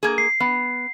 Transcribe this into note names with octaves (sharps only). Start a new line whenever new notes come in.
A#3 G#4
C7
B3